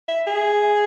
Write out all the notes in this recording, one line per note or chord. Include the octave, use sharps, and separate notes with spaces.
E5
G#4